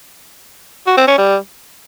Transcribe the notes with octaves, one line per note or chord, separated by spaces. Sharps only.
F#4
C4
C#4
G3